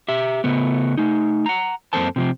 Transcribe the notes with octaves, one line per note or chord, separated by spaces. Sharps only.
G4 E5
C#3 A3 B3
A3 D#4
F#5 A#5
F#2 A#3 C4 A4 C5 A5
C3 F3 C4